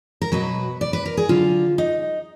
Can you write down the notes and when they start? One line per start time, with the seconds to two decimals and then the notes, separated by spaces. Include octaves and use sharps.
0.22 A#4
0.32 B2 F#3 B4
0.81 D5
0.93 B4
1.06 A#4
1.17 G#4
1.29 D3 F#3 F4
1.78 D#4